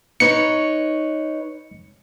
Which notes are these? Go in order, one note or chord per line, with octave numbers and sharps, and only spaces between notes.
D#4 B4 C#5 C#7